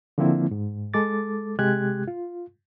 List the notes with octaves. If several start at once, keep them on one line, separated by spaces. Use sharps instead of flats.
D3 F3 A#3 C4 E4
G#2
G#3 A4 D6 A6
C3 G#3 G4 F#6 G#6
F4